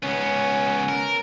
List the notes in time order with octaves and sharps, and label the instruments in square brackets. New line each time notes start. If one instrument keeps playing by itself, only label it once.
[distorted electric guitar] C#2 B3 [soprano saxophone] C#4
[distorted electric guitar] A#4